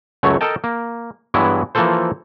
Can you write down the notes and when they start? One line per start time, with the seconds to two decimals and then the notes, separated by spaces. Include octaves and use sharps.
0.23 C#2 F#2 F#3 A3 C#5
0.41 A4 A#4 D#5 G5 A5
0.64 A#3
1.34 G2 E3 F#3 G#3 B3 E4
1.75 E3 F3 A#3 F4 A4 C5